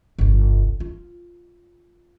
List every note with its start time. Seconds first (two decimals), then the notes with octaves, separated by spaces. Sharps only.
0.19 G1 C2
0.80 F4